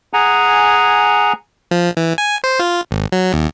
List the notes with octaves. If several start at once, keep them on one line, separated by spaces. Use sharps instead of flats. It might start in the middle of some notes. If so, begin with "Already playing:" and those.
G#4 F#5 G#5 A#5
F3
E3
G#5
C5
F4
G#1
F#3
D#2